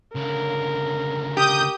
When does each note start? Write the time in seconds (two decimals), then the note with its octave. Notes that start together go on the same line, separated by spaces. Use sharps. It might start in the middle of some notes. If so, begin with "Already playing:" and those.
0.16 C#2 D3 A#4
1.37 G4 D#6 G6